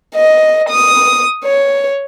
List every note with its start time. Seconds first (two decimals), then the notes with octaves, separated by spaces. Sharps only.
0.16 D#5
0.70 D#6
1.45 C#5